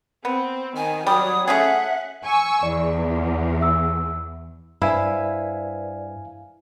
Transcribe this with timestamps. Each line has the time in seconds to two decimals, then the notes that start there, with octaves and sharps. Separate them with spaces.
0.25 B3 C4
0.77 D#3 G#5
1.07 F#3 G3 D#6
1.48 A3 C#4 G#4 E5 F#5
2.24 G#5 C#6 E6
2.63 E2 D5
3.61 E5 E6
4.82 G2 E4 B4 C5 D5 F5 G#5